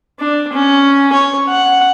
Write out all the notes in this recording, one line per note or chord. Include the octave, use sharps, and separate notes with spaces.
D4
C#4
C#5
F#5